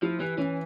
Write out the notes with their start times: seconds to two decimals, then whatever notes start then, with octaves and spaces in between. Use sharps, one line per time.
0.02 F3 E4
0.20 E3 G4
0.38 E3 C#4